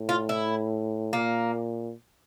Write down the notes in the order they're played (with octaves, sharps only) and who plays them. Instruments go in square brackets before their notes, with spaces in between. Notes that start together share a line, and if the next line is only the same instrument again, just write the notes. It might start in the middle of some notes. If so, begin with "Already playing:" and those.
Already playing: [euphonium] A2
[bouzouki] F4
E4
[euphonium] A#2 [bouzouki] A#3